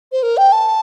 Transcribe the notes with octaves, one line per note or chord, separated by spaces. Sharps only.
C5
A#4
G5
A5